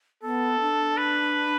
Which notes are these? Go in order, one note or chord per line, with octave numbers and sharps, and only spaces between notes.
B3 A4
D4
B4